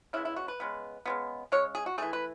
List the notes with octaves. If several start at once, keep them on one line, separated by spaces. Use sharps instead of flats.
C#3 G#3 B3 E4
E4
F#4
B4
C#3 G#3 B3
C#3 G#3 B3
C#3 G#3 C#5
G#4
F#4
E3 A3 G#4
B4